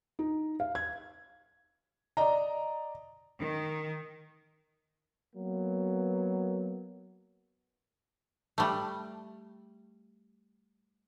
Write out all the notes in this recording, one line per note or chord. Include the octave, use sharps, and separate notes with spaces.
D#4
F5
G#6
D5 D#5 A#5
D#3
F#3 A#3 B3
G3 A3